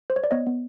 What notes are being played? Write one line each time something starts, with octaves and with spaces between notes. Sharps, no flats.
C5
C#5
D5
B3 C#5 D#5
B3